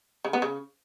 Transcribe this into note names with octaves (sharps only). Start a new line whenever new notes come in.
C#3
B3
C#3